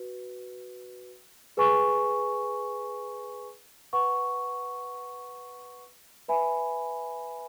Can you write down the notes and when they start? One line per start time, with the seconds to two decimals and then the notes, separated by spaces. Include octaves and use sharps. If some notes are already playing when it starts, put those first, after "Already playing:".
Already playing: F#4 B4
1.57 G#4 B4 G#5 C#6
3.93 B4 F#5 C#6
6.28 B4 E5 G#5 B5